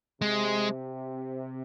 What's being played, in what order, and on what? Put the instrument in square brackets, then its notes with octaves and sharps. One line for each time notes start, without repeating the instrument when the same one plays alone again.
[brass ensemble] C3 [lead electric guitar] G#3